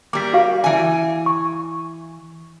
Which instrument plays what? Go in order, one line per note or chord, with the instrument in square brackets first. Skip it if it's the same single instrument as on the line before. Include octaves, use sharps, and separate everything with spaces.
[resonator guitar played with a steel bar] G3 A#3 [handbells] D6 B6
[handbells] F#4 F5
[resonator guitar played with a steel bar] E3 G#5
[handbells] C#6